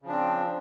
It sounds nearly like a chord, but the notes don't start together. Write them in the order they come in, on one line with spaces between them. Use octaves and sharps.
C#3 F3 D4 C4